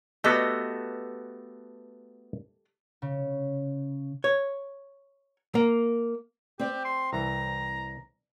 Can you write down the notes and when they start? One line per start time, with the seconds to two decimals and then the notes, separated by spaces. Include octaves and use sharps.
0.24 A3 B3 F#4 G4 A4 D#5
3.02 C#3
4.24 C#5
5.55 A#3
6.59 C4 G4 D5
6.85 C6
7.13 C2 E3 A#5